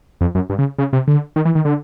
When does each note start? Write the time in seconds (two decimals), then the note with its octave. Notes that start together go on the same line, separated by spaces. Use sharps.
0.21 F2
0.35 F#2
0.50 G2
0.59 C#3
0.78 C#3
0.93 C3
1.07 D3
1.36 D#3
1.45 E3
1.55 D#3
1.65 D3